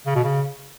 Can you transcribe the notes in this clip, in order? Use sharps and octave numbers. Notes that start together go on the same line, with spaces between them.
C#3
B2
C#3